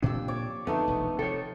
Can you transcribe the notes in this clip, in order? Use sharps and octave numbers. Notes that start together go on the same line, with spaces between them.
F2 A#2 D4 G4 E6
C#5 D5 D6
F2 D3 A3 B3 D#4 C#6
E1 A#1 F2
C3 F3 A4 C#5 G5